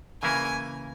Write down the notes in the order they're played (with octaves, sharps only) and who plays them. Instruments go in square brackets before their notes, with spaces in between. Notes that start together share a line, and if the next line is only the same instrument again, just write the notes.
[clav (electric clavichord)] C#3 E3 A#3 E4 [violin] G#5